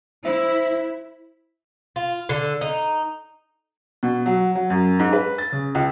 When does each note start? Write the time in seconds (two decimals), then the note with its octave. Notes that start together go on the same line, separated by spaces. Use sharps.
0.25 E4 C5 E5
1.96 F4
2.29 D3
2.61 D#4
4.03 B2
4.26 F#3
4.55 F#3
4.70 F#2
4.99 G#2
5.13 B4
5.38 A6
5.52 C#3
5.75 C#2